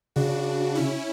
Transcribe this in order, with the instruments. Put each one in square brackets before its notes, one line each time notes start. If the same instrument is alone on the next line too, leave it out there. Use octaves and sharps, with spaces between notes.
[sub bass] C#3 [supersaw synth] D4 F#4
[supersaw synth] C#4 E4